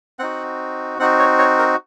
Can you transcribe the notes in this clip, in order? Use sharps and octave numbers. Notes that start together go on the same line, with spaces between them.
C4 D#4 F#4 F#5
C4 D#4 F#4 F#5
C#5
C#5
A#4